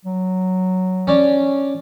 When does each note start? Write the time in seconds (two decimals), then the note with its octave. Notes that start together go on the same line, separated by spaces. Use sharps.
0.05 F#3
1.07 C#4 D4